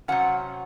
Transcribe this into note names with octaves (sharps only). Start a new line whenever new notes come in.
C3 F#3 C#4 F#5